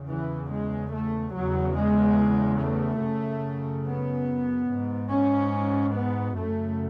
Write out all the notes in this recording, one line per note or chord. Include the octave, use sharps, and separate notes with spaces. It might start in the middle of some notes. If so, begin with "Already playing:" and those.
Already playing: E2 C#3
E3
G#3
A3
E2 C#3 F#3
G#3
A3
F#2 C#3
B3
G#2
C#4
B3
F#2 C#3 A3